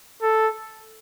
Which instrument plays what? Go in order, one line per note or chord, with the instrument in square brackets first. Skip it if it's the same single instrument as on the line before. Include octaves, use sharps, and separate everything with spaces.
[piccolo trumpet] A4